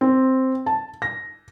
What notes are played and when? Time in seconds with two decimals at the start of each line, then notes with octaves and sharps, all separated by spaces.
0.01 C4
0.66 A5
1.02 A#6